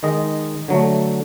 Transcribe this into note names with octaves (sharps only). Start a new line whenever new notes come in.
D#3 G#3 D#5
D3 F#3 A3